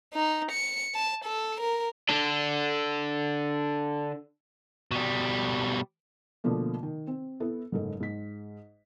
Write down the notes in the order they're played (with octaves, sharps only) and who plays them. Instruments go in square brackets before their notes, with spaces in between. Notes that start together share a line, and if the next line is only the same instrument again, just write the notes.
[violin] D#4
C#7
A5
A4
A#4
[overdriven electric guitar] D3 D4
B2 G3
[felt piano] B2 D3 F3 A3 A#3
D#3
C4
B3 E4 A4
F#1 G#2 A4
G#2 B6